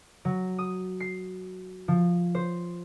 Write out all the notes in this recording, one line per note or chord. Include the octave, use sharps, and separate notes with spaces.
F#3
D#6
C7
F3
C5